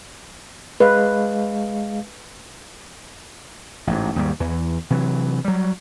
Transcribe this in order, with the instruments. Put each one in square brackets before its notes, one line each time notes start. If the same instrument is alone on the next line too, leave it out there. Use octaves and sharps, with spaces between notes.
[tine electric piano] G#3 F5 [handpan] B4
[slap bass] A1 G#2
D#2 G#2 G3
E2 E3
C3 E3 F#3
F#3 G3